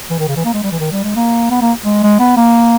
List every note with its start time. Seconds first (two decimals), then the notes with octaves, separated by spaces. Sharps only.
0.10 E3
0.19 D#3
0.28 C#3
0.36 E3
0.45 A#3
0.54 G#3
0.63 G3
0.72 E3
0.80 D#3
0.92 G3
1.04 G#3
1.16 A#3
1.50 B3
1.61 A#3
1.84 G#3
2.03 G#3
2.19 B3
2.37 A#3